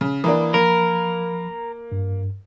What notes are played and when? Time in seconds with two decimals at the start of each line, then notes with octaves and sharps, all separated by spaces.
0.01 C#3
0.24 E3 A#3 D4 A#5 B5 D#6
0.54 F3 A#3 A#4 B5
1.92 G2